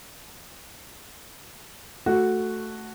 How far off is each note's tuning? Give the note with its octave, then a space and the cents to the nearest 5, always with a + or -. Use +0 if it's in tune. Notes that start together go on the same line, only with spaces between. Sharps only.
A3 +0 F#4 +0